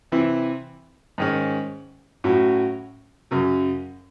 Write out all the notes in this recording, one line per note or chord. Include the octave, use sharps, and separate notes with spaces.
C3 E3 C4 E4
G#2 D#3 G#3 C#4
A2 F#3 C#4 F#4
F#2 C#3 F#3